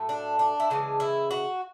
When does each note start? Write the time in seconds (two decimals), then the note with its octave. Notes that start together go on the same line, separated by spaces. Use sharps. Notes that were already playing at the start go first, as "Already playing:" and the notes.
Already playing: A2 F#3 A3
0.09 D4
0.39 D4
0.60 E4
0.70 C#3 E3 G#3 D4
1.00 E4
1.31 F#4